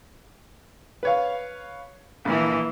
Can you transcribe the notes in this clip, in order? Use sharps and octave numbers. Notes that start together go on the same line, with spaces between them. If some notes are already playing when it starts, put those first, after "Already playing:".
B4 C#5 F5
A#1 E3 A#3